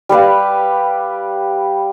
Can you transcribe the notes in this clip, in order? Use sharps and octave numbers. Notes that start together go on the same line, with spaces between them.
G3 G4 B4 F5